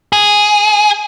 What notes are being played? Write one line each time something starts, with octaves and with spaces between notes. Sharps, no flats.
G#4